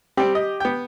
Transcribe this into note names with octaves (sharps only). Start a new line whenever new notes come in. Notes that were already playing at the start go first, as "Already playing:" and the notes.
G3 C4 G4
D#5
B3 G5